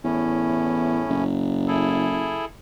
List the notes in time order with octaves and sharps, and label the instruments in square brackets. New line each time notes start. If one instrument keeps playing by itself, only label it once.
[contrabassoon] E2 [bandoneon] A2 C#4
[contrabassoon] F#1
[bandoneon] E4 G#4 A4